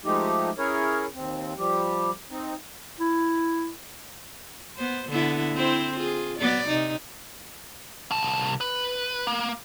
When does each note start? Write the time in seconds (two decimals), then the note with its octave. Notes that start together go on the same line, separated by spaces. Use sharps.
0.04 F3 G#3 A3 D#4 G4
0.58 C#4 E4 G#4 A#4 C#5
1.13 D#2 C4
1.58 F3 G3 G4
2.30 C4 D#4
2.99 E4
4.76 B3 C5
5.09 D3 B3 E4
5.54 C4 E4 C5
5.98 F4 G#4
6.38 F#3 B3 D5
6.68 C3 D#4
8.11 C2 A5
8.61 B4
9.27 A#3